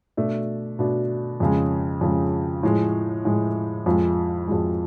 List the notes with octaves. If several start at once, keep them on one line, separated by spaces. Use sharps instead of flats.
B2 A3 D4
B2 A3 D4
F2 C#3 G#3
F2 C#3 G#3
A2 F3 G#3
A2 F3 G#3
F2 F3 G#3
F2 F3 G#3